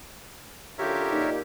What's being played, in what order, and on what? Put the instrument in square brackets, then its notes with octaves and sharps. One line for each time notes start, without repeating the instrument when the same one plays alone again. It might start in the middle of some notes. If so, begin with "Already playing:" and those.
[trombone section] F#2 D3 F4 [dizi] G4 [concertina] A#4 C#5 E5
[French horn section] A#2 D#4